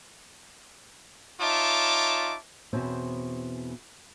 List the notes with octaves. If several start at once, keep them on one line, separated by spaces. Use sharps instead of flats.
D#4 F4 C#5 E5 A5 D6
E2 B2 C4 C#4 C5